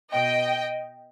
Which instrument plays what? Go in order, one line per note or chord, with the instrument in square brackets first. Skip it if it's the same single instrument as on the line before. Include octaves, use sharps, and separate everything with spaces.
[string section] B2 D#5 G5